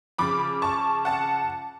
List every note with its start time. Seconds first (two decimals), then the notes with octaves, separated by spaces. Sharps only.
0.18 C#3 F3 B5 D6
0.62 A5 C#6
1.05 F#5 A5